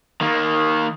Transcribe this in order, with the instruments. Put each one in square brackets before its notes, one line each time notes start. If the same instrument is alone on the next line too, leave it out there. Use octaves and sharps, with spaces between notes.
[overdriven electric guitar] D#3 A#3